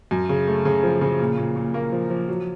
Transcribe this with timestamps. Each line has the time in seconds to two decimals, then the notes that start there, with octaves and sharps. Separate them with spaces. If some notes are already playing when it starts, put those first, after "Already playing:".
0.11 F#2
0.29 C#3
0.48 A3
0.65 C#3
0.83 F3
1.01 C#3
1.19 A#2
1.37 A#2
1.56 A#2
1.74 A#3
1.92 F3
2.10 F3
2.28 F#3